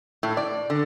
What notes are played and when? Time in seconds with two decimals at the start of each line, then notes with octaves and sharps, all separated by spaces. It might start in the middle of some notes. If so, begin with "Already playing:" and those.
0.23 A2
0.37 D5
0.70 D3